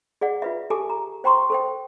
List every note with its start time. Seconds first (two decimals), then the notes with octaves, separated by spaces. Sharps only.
0.21 G#4 D5 F#5
0.42 F4 B4 E5
0.70 G4 A4 G#5 A5 D6
0.90 A#5
1.24 C5 G5 A#5 C6 C#6
1.50 A4 C5 G5